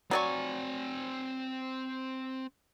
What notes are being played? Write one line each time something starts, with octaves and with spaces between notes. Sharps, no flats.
F#3 C4 D5 G#5 C#6